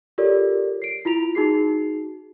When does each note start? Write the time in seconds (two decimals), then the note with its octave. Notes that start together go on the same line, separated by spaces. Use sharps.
0.18 F4 G4 A4 A#4 C#5 D5
0.82 C7 D7
1.05 E4 F4 A#5 F7
1.35 D#4 F#4 G#4 C7